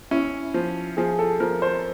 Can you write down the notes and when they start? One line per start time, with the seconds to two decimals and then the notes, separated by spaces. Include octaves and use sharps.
0.11 C#4 E4
0.54 F3
0.97 F3 G#4
1.19 A4
1.40 F3 A#4
1.62 C5